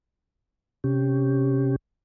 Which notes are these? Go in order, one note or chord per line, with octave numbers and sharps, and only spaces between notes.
C3 C#4 G4